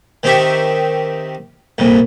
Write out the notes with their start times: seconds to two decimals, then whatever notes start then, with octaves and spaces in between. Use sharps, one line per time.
0.23 D#3 C4 D#4 G4 E5 C#6
1.78 C2 F2 A#2